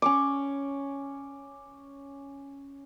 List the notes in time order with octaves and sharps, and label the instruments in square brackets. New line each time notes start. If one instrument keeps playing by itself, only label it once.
[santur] C#4 C#6 D6